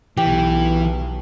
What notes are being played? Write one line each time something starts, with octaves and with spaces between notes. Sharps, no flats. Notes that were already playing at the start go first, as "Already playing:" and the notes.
B1 B2 E3 G4